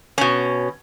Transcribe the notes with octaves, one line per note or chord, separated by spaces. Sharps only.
B2 C#4